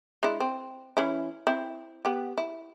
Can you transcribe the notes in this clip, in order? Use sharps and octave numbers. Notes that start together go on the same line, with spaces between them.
G#3 D4 E4
C4
E3 C#4 E4
C4 E4
B3 G4
E4